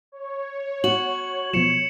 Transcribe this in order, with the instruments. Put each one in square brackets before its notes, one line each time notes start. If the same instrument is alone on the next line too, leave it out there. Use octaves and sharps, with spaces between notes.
[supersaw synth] C#5
[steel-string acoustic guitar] F#4 [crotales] F#7
[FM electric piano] B2 F3 F#3 [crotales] C#7 E7